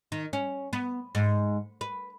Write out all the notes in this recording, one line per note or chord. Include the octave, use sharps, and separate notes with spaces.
D#3
C#4
B3
G#2
B4